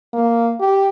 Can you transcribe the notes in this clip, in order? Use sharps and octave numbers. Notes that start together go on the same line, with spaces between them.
A#3
G4